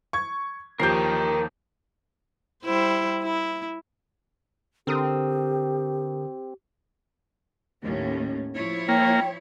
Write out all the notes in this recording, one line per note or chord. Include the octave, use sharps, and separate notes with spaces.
C#6 G#6
D#2 F3 G4 A#4 G5 G6 C7
G3 E4 C5
E4
D3 C4 G4 A#4 D#6
D#2 A2 C#4
F3 E4 C#5
A#3 G5